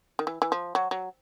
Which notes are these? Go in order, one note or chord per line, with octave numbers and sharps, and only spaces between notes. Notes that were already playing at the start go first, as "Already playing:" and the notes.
D#3
E3
E3
F3
F#3
F#3